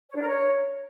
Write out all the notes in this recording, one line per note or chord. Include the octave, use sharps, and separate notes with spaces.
C#5
D4
A#4
C#5